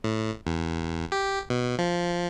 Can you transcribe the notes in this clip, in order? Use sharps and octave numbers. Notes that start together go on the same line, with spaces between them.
A2
E2
G4
B2
F3